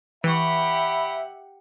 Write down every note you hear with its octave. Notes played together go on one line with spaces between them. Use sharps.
E3 G4 E5 F#5 B5 C#6